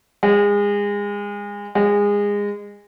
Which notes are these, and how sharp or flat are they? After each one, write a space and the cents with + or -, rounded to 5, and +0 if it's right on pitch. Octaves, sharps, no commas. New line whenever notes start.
G#3 -30
G#3 -25